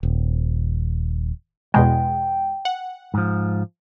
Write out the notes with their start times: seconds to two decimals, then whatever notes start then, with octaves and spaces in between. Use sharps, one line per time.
0.03 D#1
1.74 E2 B2 G#3 G5
2.65 F#5
3.14 G#2 F3